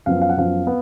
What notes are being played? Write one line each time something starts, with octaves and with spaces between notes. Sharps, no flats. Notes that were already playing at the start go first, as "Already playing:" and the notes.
F#2 F3 B3 F5
F5
F#5
F#2 F3 B3 F5
B3